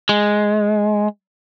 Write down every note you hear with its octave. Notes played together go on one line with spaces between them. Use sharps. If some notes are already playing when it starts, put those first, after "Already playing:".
G#3